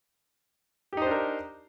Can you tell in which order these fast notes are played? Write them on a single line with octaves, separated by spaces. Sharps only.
G4 D#4 C5 D4 A#4